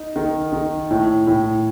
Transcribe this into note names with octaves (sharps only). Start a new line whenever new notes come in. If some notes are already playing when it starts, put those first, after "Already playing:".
Already playing: D#4
D#3
D#3
A2
A2